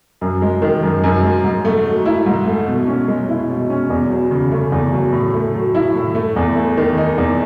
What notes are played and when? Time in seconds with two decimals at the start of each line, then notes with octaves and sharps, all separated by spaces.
0.21 F#2
0.42 G#3
0.62 D#3
0.83 F#2
1.04 F#2
1.24 G#3
1.44 G#2
1.65 A3
1.86 F#3
2.06 E4
2.26 G#2
2.46 A3
2.68 B2
2.88 C#4
3.08 G#3
3.29 E4
3.49 B2
3.70 C#4
3.90 E2
4.10 F#3
4.31 C#3
4.52 A3
4.72 E2
4.93 F#3
5.12 A2
5.34 A3
5.54 F#3
5.75 E4
5.95 A2
6.15 A3
6.36 E2
6.56 A3
6.77 D#3
6.98 D#4
7.18 E2